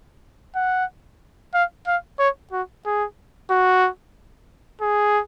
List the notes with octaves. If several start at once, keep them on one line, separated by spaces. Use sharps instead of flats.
F#5
F5
F5
C#5
F#4
G#4
F#4
G#4